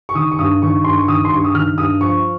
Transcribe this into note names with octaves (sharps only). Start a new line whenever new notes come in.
C#6
D#3 D#6
C#6
G2 D#6
D#3 C#6
G2 C6
C#6
D#3 D#6
C6
G2 C#6
D#6
D#3 F6
G2 D#6
F3 C#6